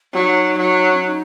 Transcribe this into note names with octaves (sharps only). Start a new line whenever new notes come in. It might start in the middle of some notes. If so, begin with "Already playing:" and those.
F#3 D#4 F4
F#3
C#4
D#4